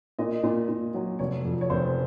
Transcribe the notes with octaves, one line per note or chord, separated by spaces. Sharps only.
A#2 D#5
A#2
A#2
F#3
F1 C#5
F2
C#5
F1 C5